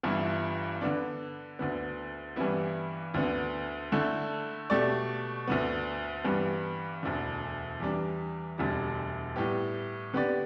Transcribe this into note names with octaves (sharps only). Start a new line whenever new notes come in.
G1 G2 E3 B3 E4
D3 B3 D4
D2 D3 B3
G2 E3 G3 B3 E4
D2 D3 B3
D3 A3 E4 A4
B2 A3 G4 D5
D2 D3 B3
G2 E3 G3 B3
E1 D2 D3
E2 E3 G3 D4
E1 D2 D3 G3
A2 G3 B3 G4
D3 B3 G4 D5